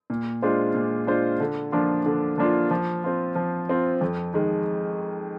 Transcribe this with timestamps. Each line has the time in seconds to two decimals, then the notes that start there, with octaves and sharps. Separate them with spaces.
0.10 A#2
0.42 G#3 D4 F4 C5
0.75 A#2
1.07 G#3 D4 F4 C5
1.40 D3
1.72 F3 A#3 D4 F4
2.06 D3
2.38 F3 A#3 D4 F4
2.71 F3
3.04 C4 F4
3.36 F3
3.69 C4 F4
4.01 F2
4.34 D#3 G#3